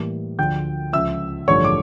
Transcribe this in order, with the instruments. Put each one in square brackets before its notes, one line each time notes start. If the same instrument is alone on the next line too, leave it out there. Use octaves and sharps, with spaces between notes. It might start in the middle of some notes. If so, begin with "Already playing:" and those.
Already playing: [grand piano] A2 E3 G3 A#3
D2 D3 F3 G5 G6
C#2 C#3 F3 E5 E6
A1 G2 D3 F3 A3 C#5 C#6
D6